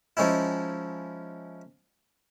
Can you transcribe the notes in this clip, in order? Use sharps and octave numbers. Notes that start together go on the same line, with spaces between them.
F3 G#3 C#4 D#4 E4